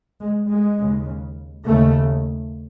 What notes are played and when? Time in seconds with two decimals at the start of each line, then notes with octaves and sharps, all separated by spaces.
0.20 G#3
0.49 G#3
0.78 D#2 C#3
1.66 D#2 C#3 A3